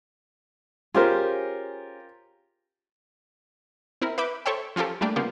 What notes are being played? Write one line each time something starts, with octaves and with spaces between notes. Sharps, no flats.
C#4 F4 G4 G#4 A#4 C5
C4 E4 A#4
B4 E5 D6 G6
A4 C5 C#5 E5 G5
F3 C#4 F4 G4 A4
G3 A3 A#3 D4 G4 G5
C#3 A#3 B3 F4 G4